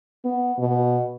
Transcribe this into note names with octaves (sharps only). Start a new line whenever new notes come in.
B3
B2